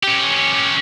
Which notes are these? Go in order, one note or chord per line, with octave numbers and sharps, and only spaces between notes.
C#4 G4